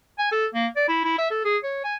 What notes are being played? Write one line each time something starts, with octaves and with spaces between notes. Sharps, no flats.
G#5
A4
A#3
D5
E4
E4
E5
A4
G#4
C#5
G#5